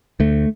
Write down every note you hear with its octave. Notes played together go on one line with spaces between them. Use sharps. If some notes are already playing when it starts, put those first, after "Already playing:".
D2 A3